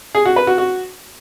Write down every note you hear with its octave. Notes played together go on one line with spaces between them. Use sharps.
G#4
F#4
B4
F#4
F#4